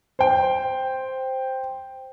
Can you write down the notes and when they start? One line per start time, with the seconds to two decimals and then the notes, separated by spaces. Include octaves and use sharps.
0.19 C5 G5